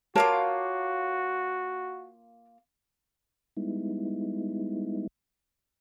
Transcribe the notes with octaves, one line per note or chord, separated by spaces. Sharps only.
A#3 F4 F#4 A#4 C#5 A5 D6
G3 G#3 B3 D#4 E4